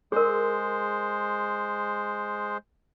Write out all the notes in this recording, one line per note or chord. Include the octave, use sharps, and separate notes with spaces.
G#3 G#4 A#4 C5